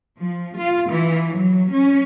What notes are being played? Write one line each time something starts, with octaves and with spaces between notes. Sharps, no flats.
F3
F4
E3
F#3
C#4